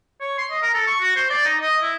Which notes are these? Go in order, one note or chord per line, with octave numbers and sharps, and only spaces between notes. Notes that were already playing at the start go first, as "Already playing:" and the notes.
C#5
C6
D#5
A#4
A4
C#6
F#4
C5
D5
D#4
D#5
E4